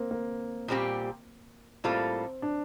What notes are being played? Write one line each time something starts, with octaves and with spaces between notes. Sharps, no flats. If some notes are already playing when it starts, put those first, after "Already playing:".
Already playing: A#3 C4
A#3
A#2 G3 C4 G4
A2 G3 A#3 C4 F4 A4
D4